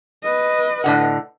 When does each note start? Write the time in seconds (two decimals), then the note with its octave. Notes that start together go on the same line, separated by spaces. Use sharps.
0.23 B4 D#5
0.84 A2 D3 F#5